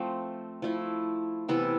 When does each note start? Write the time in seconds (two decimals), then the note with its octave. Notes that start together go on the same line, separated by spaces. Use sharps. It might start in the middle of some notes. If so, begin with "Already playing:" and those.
Already playing: F3 A3 C4
0.62 F3 A3 E4
1.48 C3 E3 B3 E4 A4